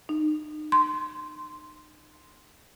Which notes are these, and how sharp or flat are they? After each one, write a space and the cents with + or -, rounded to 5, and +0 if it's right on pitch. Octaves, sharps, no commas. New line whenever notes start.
D#4 -35
C6 +0